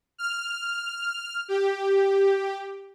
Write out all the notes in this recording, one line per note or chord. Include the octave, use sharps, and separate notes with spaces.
F6
G4